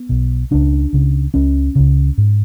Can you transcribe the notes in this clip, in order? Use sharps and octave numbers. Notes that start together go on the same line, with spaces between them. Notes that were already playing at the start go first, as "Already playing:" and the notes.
Already playing: B3
B1 B2
C#2 C#3 D4
C#2 C#3
C#2 C#3 C#4
C#2 C#3
G#2